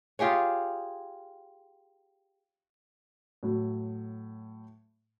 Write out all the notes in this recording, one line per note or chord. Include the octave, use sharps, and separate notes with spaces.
F4 G4 G#4 C#5
A2 F#3